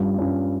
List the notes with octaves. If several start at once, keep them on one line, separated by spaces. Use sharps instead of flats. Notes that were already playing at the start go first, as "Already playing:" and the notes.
Already playing: G2 G3 C#4 F4
G2 G3 C#4 F4